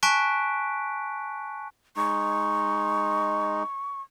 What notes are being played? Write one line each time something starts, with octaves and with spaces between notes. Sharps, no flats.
G#5 A5 C#6 F#6 B6 D7
G#3 D#4 C#6